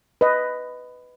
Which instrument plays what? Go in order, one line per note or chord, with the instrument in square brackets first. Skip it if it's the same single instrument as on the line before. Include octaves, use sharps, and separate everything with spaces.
[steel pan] B4 D#5